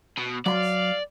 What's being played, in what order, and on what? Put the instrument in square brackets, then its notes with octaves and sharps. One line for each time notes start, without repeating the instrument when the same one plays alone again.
[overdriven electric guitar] B2
[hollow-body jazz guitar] F#3 B5 C6 [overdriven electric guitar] D5 [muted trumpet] F5